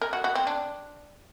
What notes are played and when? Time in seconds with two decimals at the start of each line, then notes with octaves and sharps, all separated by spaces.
0.01 A#4
0.13 F#4
0.24 F#4
0.35 C4
0.47 D4